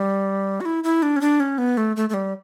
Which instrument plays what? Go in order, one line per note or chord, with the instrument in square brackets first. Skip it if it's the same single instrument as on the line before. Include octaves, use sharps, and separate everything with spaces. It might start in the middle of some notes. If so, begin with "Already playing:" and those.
Already playing: [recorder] G3
F#4
E4
E4
D4
C#4
D4
C#4
B3
A3
A3
A3
G3